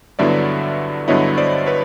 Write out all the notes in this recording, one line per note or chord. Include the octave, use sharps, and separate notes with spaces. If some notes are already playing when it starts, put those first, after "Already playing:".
G2 D3 F#3 B3 E4 D5 E5
G2 D3 F#3 B3 E4 C#5 D#5
C5 D5
B4 C#5